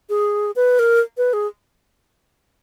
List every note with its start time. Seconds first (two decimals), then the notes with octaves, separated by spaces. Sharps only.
0.09 G#4
0.56 B4
0.79 A#4
1.17 B4
1.33 G#4